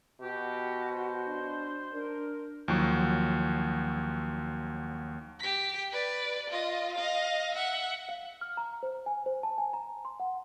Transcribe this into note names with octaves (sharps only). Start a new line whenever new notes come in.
B2 F#4 G4
C5
D4
D4 A#4
D#2 F3 F#3 F#4
G4 B6
B4 D5
F4 D#5
D#5 F5
E5 F#5
F5
F6
A#5
C5
G#5
C5
A5
G#5
A#5
C6
F#5